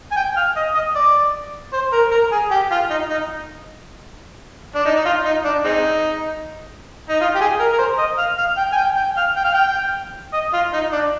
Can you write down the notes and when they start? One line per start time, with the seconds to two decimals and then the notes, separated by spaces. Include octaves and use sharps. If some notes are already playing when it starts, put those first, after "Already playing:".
0.12 G#5
0.16 G5
0.37 F5
0.56 D#5
0.75 D#5
0.95 D5
1.73 C5
1.93 A#4
2.12 A#4
2.32 G#4
2.51 G4
2.71 F4
2.90 D#4
3.10 D#4
4.75 D4
4.86 D#4
4.96 D#4
5.05 F4
5.25 D#4
5.45 D4
5.65 G#3 C4 D#4
7.09 D#4
7.21 F4
7.35 G4
7.41 G#4
7.60 A#4
7.72 A#4
7.79 C5
7.99 D#5
8.19 F5
8.38 F5
8.57 G5
8.73 G#5
8.77 G5
8.96 G5
9.17 F5
9.36 G5
9.45 F5
9.54 G5
10.33 D#5
10.54 F4
10.74 D#4
10.92 D4